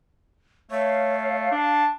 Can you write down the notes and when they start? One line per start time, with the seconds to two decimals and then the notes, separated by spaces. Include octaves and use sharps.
0.71 A3 C#5 F5
1.52 D4 A5